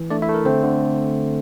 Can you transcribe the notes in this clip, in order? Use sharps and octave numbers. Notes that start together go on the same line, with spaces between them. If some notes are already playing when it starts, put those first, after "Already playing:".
Already playing: E3
A3 D4 D5
E4 E5
A3
A#4
D3 C4 C5
D3